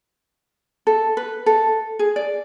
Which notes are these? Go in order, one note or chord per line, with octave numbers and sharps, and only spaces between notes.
A4
B4
A4
G#4
D5